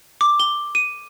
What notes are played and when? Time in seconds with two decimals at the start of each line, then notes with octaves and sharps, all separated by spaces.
0.21 D6
0.40 G7
0.75 D#7